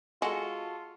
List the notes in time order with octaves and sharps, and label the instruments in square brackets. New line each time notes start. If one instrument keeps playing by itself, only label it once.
[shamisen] G#3 [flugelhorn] F4 [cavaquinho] F#4 A4